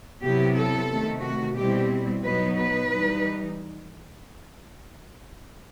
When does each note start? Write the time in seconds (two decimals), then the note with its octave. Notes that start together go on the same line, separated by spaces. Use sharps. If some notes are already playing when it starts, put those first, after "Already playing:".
0.23 C3 F#3 B3 E4 G4
0.56 A4
0.90 C3 D#3 A3
1.22 F#4
1.56 B2 G3 C4 E4 G4
2.22 B2 F#3 B3 D#4 B4
2.56 B4
2.89 E3 G3 D#4